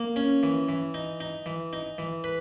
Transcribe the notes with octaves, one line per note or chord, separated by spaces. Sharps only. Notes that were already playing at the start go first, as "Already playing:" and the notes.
Already playing: A#3
C#4
E3
E3
D#4
D#4
E3
D#4
E3
B4